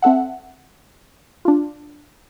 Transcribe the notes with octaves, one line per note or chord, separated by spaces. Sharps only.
C4 A4 E5 F#5
D4 F4